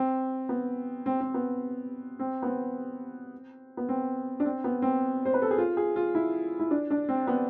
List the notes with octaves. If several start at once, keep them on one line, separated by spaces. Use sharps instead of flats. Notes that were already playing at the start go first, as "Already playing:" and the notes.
Already playing: C4
B3
C4
C4
B3
C4
B3
C4
B3
C4
D4
C4
B3
C4
C5
B4
A4
G#4
F4
G#4
F4
E4
E4
D4
D4
C4
B3